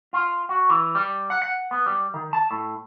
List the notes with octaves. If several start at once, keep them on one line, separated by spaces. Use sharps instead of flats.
F4
F#4
E3
G3
F#5
F#5
B3
G3
D#3
A5
A2